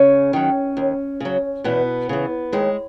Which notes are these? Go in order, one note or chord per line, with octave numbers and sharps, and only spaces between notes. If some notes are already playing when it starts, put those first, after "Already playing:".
Already playing: C#3 C#4
D#3 F#3
D#2
C#3 F#3
E2 B2 B3
C#3 E3
D#2 G#3